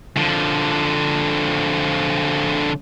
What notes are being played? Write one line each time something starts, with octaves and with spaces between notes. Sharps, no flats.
D3 F3